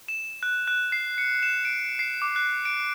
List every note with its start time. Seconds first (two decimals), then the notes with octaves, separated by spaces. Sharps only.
0.08 E7
0.43 F#6
0.68 F#6
0.92 C7
1.18 C#7
1.43 E7
1.65 D7
1.99 C7
2.22 D6
2.36 F#6
2.65 D7